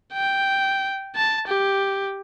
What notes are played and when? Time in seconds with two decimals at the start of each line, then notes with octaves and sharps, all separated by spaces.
0.13 G5
1.16 A5
1.48 G4